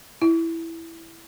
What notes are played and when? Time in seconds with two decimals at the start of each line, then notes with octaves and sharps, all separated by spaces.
0.22 E4